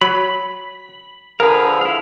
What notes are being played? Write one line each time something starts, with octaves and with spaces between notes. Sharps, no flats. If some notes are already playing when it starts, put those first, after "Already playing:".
F#3 B5
D3 F3 G#4 A#4 B4 F5
E4 F5